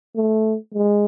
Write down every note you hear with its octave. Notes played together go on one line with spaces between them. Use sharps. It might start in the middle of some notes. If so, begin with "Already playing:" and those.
A3
G#3